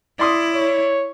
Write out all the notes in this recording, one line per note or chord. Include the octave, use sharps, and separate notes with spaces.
E4 D5 C6 D#6
C#5